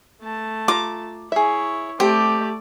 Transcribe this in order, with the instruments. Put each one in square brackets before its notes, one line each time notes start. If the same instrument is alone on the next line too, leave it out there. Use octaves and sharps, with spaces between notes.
[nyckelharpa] A3 A5
[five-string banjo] F4 A#5 [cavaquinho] D6
[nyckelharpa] E4 C#5 [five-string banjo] G#4 E5
[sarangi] A3 [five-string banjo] C4 [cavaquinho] G4 [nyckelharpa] D5 D6